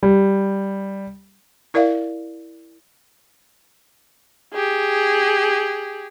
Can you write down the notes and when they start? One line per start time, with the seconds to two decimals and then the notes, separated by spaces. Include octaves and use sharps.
0.03 G3
1.74 E4 A#4 D5 E5 F5
4.53 G4 G#4